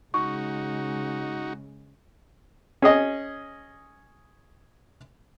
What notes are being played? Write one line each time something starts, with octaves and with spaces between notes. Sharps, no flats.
C#3 G#3 D#4 F#4 C#6
C#4 G#4 D#5